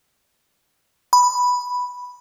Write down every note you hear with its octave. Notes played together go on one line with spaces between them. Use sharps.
B5